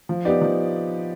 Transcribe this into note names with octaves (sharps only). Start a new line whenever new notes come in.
F3
B3 D#4 G4 D5
F3